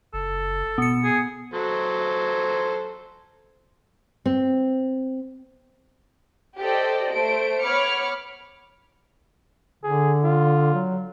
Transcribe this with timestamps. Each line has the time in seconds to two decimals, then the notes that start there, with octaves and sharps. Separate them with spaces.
0.14 F#1 A4
0.78 B2 B3 C#7
1.04 G#4
1.53 F#3 A4 C5
4.26 C4
6.59 G4 A4 C5 D5 D#5 G5
7.13 A3 C5 D7
7.63 B3 C#5 B5 D6 F6 C#7
9.84 D3 G#4
10.24 F4
10.73 F#3